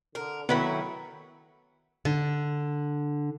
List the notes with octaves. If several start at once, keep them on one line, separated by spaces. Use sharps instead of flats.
D3 A#4
D#3 F#3 A3 B3 E4 B4 B5
D3